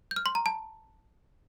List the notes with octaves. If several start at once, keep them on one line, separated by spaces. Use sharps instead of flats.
G6
F6
C6
A#5
A5